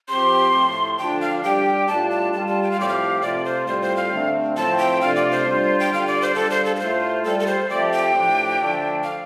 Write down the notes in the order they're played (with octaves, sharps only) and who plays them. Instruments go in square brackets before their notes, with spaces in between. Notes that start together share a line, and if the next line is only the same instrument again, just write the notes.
[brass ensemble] F3 C4 G4 [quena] C6
[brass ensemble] A2 F3 A3
[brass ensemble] D3 F3 D4 F4 [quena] G5
[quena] F5
[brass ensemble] G3 D4 G4 [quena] G5
[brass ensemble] A2 G3 D4 F4 [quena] A5
[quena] A5
[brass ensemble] G3 F4 [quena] A5
[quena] A5
G5
F5
[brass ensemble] A2 F3 C4 G4 [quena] D5
[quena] F5
[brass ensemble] C3 A3 F4 [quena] D5
[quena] C5
[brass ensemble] A2 G3 C4 F4 [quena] C5
[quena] C5
F5
[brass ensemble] D3 A3 C4
[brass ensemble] A2 F3 A3 C4 [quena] A5
[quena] G5
[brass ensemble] C3 A3 D4 F4 [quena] F5
[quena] D5
C5
[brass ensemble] G3 D4 F4
[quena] G5
[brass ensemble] D3 G3 F4 [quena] F5
[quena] D5
C5
[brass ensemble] G3 D4 F4 [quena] A4
[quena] C5
A4
A4
[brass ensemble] A2 A3 F4 [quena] C5
[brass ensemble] G3 F4 [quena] A4
[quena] A4
C5
[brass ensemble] F3 A3 C4 G4 [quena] D5
[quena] G5
[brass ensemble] A2 F3 D4 G4
D3 F3 A3 D4
[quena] F5